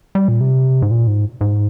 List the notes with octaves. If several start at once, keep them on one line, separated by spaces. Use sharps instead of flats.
G3
A#2
C3
G#2
A#2
G#2
G#2